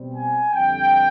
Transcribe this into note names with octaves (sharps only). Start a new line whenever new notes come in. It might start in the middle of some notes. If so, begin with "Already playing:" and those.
Already playing: B2 G3 C4
G#5
F2 D3 G3 G5